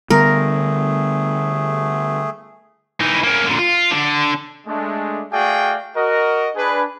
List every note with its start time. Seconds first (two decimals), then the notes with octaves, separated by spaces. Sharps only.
0.10 D3 G3 A3 B3 G#4 A#4
3.01 E3 D#4
3.24 A#3 C#4
3.46 A#2 D3
3.59 F4
3.91 D3
4.67 G#3 A3 D4
5.33 A3 F#4 G#4 D5 F5 G5
5.95 F#4 A#4 D#5
6.56 D4 G#4 B4